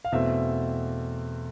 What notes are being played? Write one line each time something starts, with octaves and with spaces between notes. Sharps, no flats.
F5
E2 B2 A3 C4 E5